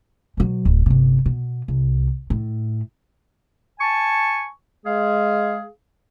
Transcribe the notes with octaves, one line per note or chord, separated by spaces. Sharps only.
B2 F#3
D1
G1 C3
B2
C2
A2
G#5 A5 C#6
G#3 G#4 F5